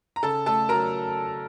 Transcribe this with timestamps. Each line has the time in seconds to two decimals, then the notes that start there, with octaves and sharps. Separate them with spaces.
0.16 A#5
0.23 C#3 A4 A5
0.46 A3 A4 A5
0.69 F#3 A#4 A#5